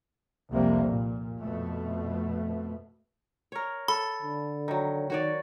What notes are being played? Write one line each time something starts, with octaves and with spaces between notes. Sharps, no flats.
C2 F2 C3 G3 A#3
A#2
F2 B2 A3
A#4 C#5
A4 B5
D3
D#3 F#3
D#3 F#4 C#5 D5